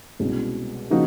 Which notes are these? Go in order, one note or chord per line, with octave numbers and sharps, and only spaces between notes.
C2 B2 G#3 C#4
C#3 F3 A#3 D#4 F#4